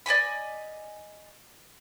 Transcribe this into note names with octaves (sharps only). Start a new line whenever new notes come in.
D5 D#5 G#5 B5